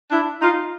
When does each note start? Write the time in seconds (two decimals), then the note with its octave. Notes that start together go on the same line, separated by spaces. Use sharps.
0.12 D4 E4
0.41 D#4 F4